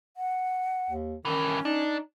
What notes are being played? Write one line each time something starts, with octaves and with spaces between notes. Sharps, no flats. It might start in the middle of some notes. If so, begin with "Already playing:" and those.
F#5
D#2
G2 D#3 E3 C#4
D4 D#4